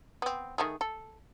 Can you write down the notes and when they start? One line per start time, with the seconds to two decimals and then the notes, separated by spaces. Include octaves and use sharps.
0.22 B3 C4
0.58 D#3 A3 G#4
0.81 A4